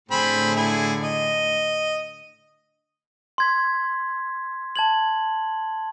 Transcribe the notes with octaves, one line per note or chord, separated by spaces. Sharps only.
A2 D3 C4 G#4 B5
E4 G#4
D#5
C6 G#6 B6
A5 G#6 F#7